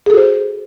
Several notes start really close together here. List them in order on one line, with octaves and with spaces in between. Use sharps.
G#4 A4 F#4 C5